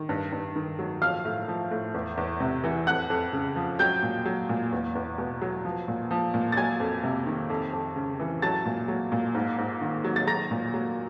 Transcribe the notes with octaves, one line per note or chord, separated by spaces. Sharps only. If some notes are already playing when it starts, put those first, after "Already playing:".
Already playing: D#3
G2
G2
D#3
F#3
F3 F5 F6
A2
F3
A2
E2
E2
C3
E3
F2 F#5 F#6
F2
C#3
F3
F#3 G5 G6
A#2
F#3
A#2
E2
E2
B2
F#3
F3
A#2
F3
A#2
A6
F#3 G#5 G#6
F2
C3
D#3
F2
F2
C#3
E3
F#3 A5 A6
A#2
F#3
A#2
G#2
G#2
D#3
F#3
A6
F#3 A#5 A#6
A#2
F#3